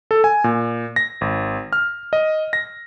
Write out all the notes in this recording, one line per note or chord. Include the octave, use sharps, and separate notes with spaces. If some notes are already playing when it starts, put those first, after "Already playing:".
A4
G#5
A#2
A#6
G#1
F6
D#5
A#6